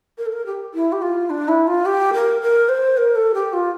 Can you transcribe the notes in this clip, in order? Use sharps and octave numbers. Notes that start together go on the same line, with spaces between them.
A#4
A4
A#4
G4
E4
G4
F4
D4
E4
F4
G4
A#4
A#4
C5
A#4
A4
G4
F4